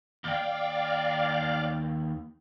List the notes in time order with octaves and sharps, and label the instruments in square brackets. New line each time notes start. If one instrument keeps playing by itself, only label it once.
[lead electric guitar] D#2 G5 [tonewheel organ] D5 F5